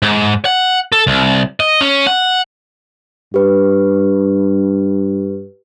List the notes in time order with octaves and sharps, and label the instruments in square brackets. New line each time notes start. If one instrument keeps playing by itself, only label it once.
[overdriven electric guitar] G#2
F#5
A4
C2
D#5
C#4
F#5
[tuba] G2 [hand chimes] G4 B4